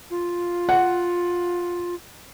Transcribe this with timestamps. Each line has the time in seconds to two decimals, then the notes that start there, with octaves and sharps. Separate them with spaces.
0.10 F4
0.69 F#5